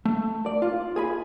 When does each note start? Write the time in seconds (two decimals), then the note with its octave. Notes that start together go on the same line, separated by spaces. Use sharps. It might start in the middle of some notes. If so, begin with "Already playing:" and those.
0.05 A3
0.46 D5
0.62 F4
0.96 G#4 G#5 B5